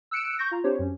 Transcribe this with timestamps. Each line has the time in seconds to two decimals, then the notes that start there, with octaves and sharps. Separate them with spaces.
0.11 E6 F#6 C#7 D7 E7
0.39 C#6 G6 A#6
0.51 F4 A#5
0.64 C4 D4 G4 C5 C#5
0.79 F#2 C#4